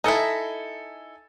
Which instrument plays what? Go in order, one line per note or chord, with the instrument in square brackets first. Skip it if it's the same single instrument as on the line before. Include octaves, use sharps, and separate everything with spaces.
[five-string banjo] D#4 E4 [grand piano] A4 G#5